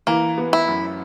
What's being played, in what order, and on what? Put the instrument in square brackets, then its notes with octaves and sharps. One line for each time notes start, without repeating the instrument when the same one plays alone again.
[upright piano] E3 [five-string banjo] A#3
[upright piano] B3
[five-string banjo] E4
[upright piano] F#2